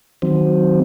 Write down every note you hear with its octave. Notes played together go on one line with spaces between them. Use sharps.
D#3 F#3 C4